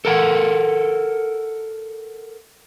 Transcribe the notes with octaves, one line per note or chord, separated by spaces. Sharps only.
A4 A#4 F#5